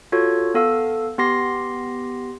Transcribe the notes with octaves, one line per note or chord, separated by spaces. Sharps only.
F4 F#4 A4 C#5 G#6
B3 A4 F5 E6
B3 G4 C6 A#6 C7